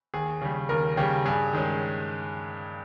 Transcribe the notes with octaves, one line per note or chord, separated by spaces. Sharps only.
D#2 G#4
C#3 G3
D#2 A#4
C#3 G3 G4
G2 G#4
D#3 G#3 C#4